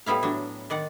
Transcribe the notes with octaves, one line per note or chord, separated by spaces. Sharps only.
A2 G3 B3 E4 F5
A2 F#3 D4
D#3 D5 F#5